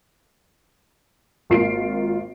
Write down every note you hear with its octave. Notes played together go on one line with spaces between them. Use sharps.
G#1 A#3 F4 C7 D7